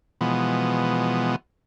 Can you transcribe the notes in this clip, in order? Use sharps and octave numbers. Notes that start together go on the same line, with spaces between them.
B2 E3 F3 G#3 B3